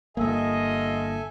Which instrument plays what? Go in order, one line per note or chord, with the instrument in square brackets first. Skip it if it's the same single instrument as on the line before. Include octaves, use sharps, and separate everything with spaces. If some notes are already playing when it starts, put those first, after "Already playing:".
[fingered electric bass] G1 F2 A#3 [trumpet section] F4 D#5 [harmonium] A4 E5 G#5